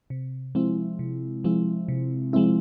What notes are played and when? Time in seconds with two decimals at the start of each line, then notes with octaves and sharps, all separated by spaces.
0.10 C3
0.55 F3 G#3 C4 E4
0.99 C3
1.44 F3 G#3 C4 E4
1.88 C3
2.33 F3 G#3 C4 E4